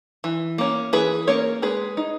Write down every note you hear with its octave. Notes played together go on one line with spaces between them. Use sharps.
E3
A#3 C#4
E3 G#4 B4
A#3 C#4 A#4 C#5
G#3 G#4 B4
D#4